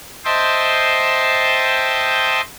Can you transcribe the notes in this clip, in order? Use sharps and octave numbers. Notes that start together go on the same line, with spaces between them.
C5 D#5 E5 G5 A5 C6